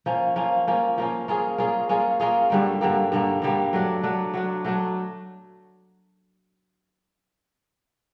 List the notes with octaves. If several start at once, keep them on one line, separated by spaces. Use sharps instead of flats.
F3 A#3 C#4
F3 A#3 C#4
F3 A#3 C#4
F3 A#3 C#4
A#3 C#4 F4 G#4
A#3 C#4 F4 G#4
A#3 C#4 F4 G#4
A#3 C#4 F4 G#4
G2 D3 G3 A#3
G2 D3 G3 A#3
G2 D3 G3 A#3
G2 D3 G3 A#3
F#3 A3 D4
F#3 A3 D4
F#3 A3 D4
F#3 A3 D4